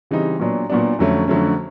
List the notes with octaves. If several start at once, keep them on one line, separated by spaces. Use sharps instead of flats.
C#3 E3 G3 C4 D#4
A#2 F#3 B3 D4
A#2 F#3 B3 D4
F2 D3 F#3 A3 C#4
F2 D3 F#3 A3 C#4